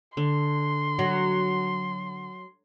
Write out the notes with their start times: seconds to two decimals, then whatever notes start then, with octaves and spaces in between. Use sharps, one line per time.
0.17 D3 C6
0.99 F#3